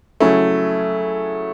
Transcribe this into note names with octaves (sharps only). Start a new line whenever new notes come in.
C#3 F#3 A3 C#4 E4 A4